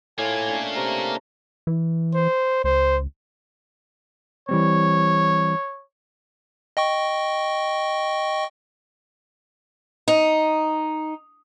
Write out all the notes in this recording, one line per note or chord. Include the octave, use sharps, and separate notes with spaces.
A2 A#3 F4 G#5
A3 C#4 D4
C3 A#5
E3
C5
C#2 C5
E3 G3 C4 C#5
D#5 G5 C#6
D#4